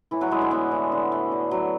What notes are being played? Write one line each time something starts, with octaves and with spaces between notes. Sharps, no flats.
A2 E3 E4
F#3 F#4
E3 G#3 E4
D3 D4
A2 B3
E3
D3
A3
D3
F#3